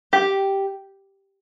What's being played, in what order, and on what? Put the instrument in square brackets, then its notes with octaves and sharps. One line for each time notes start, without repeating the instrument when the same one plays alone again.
[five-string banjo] G4